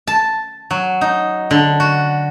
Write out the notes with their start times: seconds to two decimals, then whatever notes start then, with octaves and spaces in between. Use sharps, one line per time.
0.07 A5
0.71 F#3
1.01 D#4
1.51 D3
1.80 F#4